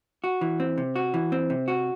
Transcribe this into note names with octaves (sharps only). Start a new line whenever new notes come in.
F#4
E3
C4
C3
F#4
E3
C4
C3
F#4